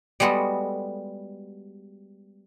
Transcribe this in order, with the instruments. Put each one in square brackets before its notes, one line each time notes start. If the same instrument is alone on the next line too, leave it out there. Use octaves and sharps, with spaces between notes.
[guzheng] G3 G#3 B3 F#4 A4